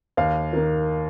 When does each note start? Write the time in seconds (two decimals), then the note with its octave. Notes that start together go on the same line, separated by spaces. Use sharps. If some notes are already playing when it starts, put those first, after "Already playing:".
0.17 D#2 F5
0.53 D#3 A#3